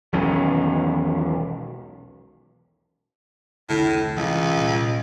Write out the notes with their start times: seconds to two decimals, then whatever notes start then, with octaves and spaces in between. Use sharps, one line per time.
0.13 E1 B1 D#3 C#4
3.69 E1 C2 A2 D3
4.17 C#2 C3 E3
4.57 A#2 G3